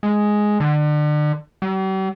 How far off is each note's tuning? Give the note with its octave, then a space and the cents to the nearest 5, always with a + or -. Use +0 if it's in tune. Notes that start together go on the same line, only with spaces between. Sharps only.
G#3 +5
D3 +35
G3 -45